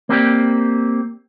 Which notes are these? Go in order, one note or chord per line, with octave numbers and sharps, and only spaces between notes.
A#3 C4 G4 D5